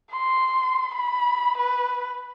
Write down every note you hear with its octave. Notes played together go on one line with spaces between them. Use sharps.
C6
B5
B4